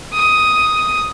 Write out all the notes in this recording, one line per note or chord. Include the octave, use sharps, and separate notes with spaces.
D#6